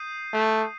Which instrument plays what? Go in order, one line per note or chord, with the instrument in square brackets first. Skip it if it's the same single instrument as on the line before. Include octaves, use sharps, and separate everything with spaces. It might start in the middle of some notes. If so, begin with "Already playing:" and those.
Already playing: [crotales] D#6 G6 C7 D#7
[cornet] A3